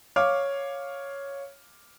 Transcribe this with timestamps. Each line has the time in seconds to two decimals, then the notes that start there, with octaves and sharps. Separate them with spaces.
0.16 C#5 F5 D6 F6